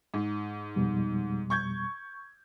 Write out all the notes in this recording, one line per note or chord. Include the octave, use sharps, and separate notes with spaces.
G#2
F2 B2 G3
C#6 G6 G#6